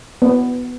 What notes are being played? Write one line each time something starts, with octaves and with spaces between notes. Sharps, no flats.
B3